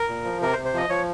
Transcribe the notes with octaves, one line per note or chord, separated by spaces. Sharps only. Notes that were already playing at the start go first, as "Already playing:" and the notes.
Already playing: A#4
A#2
F3
C3 A#4
C5
C3
C5
F3 D#5
F3 C#5